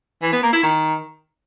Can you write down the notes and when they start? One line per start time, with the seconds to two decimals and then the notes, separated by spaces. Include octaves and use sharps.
0.22 E3
0.33 B3
0.43 A#3
0.53 E4
0.63 D#3